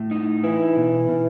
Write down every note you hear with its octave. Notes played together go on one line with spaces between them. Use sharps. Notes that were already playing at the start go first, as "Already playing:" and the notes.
Already playing: A2
D#4
E3 E4
B2
B2